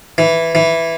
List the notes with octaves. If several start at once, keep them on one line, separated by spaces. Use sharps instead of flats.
E3
E3